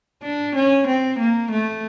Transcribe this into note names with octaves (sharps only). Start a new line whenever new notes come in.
D4
C#4
C4
A#3
A3